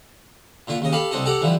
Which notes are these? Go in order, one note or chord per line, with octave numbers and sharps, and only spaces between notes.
A#2 D3 F4
D#2 C#3 D#5
G4 A4 F5 B5
C2 C4 D4 D#4 A4
G4 A4 F#5 A#5 D6
D3 E3 F3 G3